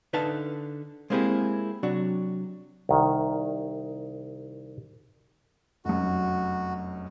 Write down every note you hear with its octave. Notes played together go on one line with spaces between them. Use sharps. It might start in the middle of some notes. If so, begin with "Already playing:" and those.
D3 D#4 B4 E5 F5 A5
G#3 A#3 C4 E4 G4 G#4
C3 F#3 D4 F#4
C2 D#3
F1 F#2 F#4